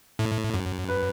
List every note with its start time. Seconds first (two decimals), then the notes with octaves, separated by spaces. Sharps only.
0.19 A2
0.54 F#2
0.88 B4